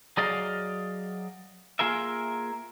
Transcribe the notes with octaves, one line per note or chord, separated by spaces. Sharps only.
F#3 G#4 D5 D#5 F5
A#3 F4 G#4 A#4 E5